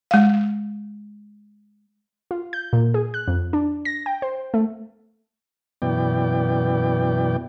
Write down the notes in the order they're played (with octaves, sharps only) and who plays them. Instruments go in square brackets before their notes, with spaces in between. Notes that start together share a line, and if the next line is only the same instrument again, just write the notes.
[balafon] G#3 F5
[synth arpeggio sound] F4
G6
A#2
G#4
F#6
F2
D4
A#6
G5
C5
A3
[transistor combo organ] F#2 B2 E3 B3 D5 G5